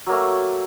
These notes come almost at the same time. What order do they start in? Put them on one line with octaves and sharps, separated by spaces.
F#3 A#3 A3